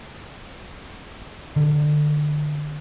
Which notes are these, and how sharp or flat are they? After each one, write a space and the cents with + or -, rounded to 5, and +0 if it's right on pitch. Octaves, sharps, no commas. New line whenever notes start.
D3 +25